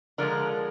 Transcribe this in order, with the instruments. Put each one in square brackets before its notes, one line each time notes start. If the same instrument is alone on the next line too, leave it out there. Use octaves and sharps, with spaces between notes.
[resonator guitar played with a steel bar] D3 F3 G#3 A#4